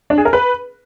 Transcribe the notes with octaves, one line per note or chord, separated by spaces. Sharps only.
D4
G#4
A#4
B4